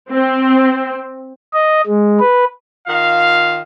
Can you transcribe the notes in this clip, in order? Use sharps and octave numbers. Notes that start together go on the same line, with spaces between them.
C4
D#5
G#3
B4
D#3 F4 F5